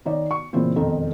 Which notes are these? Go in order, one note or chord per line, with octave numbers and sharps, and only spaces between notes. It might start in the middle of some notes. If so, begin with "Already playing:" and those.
D#3 D#4 C#5 D5
C#6
A#2 C#3 E3 A#3 C4 F4
E1 F2 D#3 D#4 A4